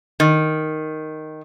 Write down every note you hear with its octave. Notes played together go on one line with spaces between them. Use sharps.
D#3